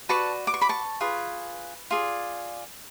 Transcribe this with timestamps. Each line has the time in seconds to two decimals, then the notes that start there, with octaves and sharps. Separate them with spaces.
0.09 F#4 B4 D5 A5 C#6
0.47 D6
0.54 C#6
0.61 B5 D6
0.69 A5 C#6
1.01 F4 G#4 B4
1.91 F4 G#4 D5